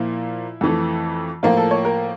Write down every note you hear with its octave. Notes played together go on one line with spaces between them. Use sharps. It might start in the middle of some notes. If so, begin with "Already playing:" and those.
Already playing: A#2 F3 A#3 E4
F2 E3 A3
A2 F3 A#3 F4
A4
C#5
A#4